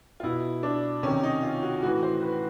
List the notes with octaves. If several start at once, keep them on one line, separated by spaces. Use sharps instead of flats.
F4
B2 E4
D4
C3 D#3 C#4
D#4
F4
F#4
A2 E3 F#4
C5
B4